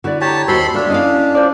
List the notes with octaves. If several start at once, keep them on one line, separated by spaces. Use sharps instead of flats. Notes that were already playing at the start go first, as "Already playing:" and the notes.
D3 E4 F#4 D5
G4 C#5 A5 A#5
D#2 F#4 A4 C5 B5 C6
A3 D4 F4 B4 C#5
C#4 E4 D#5 F5
F4 C5 D5